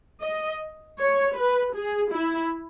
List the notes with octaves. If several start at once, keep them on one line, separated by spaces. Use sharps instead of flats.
D#5
C#5
B4
G#4
E4